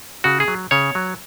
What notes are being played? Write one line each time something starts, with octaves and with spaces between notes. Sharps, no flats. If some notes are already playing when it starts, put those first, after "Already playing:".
C#3 F#4
G#4
F#3
C#3 C#5
F#3